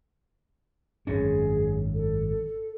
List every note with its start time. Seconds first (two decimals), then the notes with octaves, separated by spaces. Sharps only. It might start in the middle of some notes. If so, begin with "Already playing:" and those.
1.07 G#1 F#2 C#4 G#4
1.94 A4